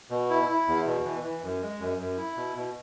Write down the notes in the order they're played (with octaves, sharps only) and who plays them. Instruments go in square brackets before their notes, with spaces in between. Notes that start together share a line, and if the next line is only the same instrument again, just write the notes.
[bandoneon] B2
E4
E4
E2
B2
E3
E3
F#2
G#3
F#2
F#2
E4
B2
B2